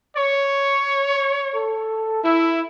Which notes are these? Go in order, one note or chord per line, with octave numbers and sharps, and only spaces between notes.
C#5
A4
E4